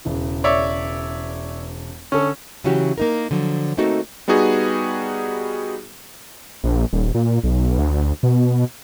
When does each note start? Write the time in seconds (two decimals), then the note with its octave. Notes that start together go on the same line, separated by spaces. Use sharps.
0.05 E1 C#3 E3
0.44 C#5 D5 E5
2.12 D3 C#4 A4
2.64 C#3 E3 F#3 C#4 F#4 G4
2.98 A#3 D#4 A#4
3.31 D3 F3 F#3
3.77 A3 A#3 C4 D#4 F#4 A4
4.28 G3 B3 D#4 F#4 G#4
6.64 A#1
6.93 D#1
7.14 A#2
7.43 B1
7.78 D2
8.23 B2